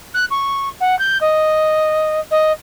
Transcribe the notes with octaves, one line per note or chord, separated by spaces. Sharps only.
F#6
C#6
F#5
G6
D#5
D#5